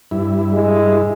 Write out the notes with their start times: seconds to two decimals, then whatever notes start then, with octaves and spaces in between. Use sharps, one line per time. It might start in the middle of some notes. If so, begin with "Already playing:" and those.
0.11 G2 E4
0.53 G#3